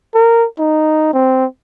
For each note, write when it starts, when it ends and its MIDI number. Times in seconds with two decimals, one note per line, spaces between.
0.14 0.46 70
0.59 1.11 63
1.13 1.45 60